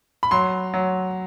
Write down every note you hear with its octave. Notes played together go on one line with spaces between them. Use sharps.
B5
F#3 C6
F#3